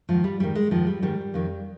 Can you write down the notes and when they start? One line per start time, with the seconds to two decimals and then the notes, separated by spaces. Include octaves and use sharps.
0.09 G#2 D#3 F3
0.24 G3
0.40 G#2 D#3 G3
0.55 G#3
0.71 G#2 D#3 F3
0.87 G3
1.02 G#2 D#3 G3
1.34 F2 D#3